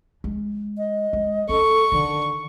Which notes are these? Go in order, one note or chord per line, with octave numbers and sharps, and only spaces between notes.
G#3
D#5
G#3
C#4 A4 C#6
D3 D#3